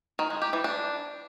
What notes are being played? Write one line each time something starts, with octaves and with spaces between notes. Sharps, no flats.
D#3
G#3
G4
E3
D4